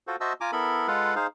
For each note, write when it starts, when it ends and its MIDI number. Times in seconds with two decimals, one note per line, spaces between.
0.07 0.16 65
0.07 0.16 66
0.07 0.16 69
0.07 0.16 72
0.21 0.33 66
0.21 0.33 72
0.21 0.33 75
0.21 0.33 76
0.21 0.33 81
0.21 0.33 88
0.41 0.51 65
0.41 0.51 80
0.41 0.51 82
0.41 0.51 86
0.53 0.87 59
0.53 0.87 64
0.53 0.87 69
0.53 0.87 70
0.53 0.87 83
0.88 1.15 56
0.88 1.15 65
0.88 1.15 69
0.88 1.15 71
0.88 1.15 77
0.88 1.15 78
1.16 1.27 63
1.16 1.27 68
1.16 1.27 72
1.16 1.27 77